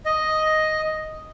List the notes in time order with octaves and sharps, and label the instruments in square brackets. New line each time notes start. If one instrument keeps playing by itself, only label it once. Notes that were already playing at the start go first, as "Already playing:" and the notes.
[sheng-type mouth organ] D#5